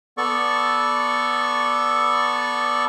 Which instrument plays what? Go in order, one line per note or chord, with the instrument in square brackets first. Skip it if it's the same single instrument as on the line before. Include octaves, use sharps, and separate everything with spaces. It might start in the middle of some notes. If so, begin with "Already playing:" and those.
[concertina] B3 A4 D5 C#6